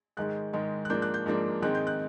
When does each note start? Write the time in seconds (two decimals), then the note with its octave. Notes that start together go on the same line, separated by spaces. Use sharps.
0.17 G#2 D#3 G#3 F#6
0.53 G#2 D#3 G#3
0.85 F#6
0.90 G#2 F3 A#3 D4 G6
1.02 F#6
1.14 G6
1.26 G#2 F3 A#3 D4
1.62 G#2 D#3 G#3 C4 D#4 F#6
1.75 G6
1.87 F#6